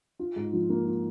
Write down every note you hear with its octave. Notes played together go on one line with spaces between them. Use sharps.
F4
G#2
F3
A#3
F4